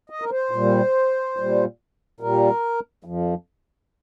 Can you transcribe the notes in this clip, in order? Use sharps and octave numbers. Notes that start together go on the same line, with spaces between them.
D#5
A#4
C5
A#2
G3
A#2 G3
A#2 G3 A#4
F2 F3